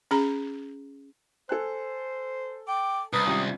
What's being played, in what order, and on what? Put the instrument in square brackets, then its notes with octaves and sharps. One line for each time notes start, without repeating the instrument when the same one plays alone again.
[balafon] C#4 G#4 A#5
[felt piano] A4 G#5 F#6 [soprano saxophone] C5
[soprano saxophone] G5 [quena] D6
[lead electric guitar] C2 [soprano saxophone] B4 [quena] D#6
[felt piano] G#1 C#4 F4 [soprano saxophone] G4